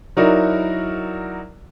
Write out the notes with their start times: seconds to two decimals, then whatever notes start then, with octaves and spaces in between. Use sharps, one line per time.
0.17 F#3 D#4 E4 F#4 A#4 D5